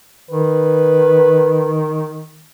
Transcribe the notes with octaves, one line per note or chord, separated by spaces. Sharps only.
D#3 B4